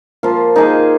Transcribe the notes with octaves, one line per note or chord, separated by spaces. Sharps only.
F3 A#3 F4
A#3 D#4 G#4 D#5